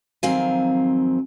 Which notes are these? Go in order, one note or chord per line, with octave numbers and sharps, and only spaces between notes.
F2 D#3 F#3 C4 F5 G#5